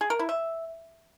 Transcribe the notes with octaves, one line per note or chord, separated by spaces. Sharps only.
G#4
A#4
E4
E5